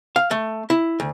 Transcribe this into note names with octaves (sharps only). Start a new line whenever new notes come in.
F5
A3
E4
D2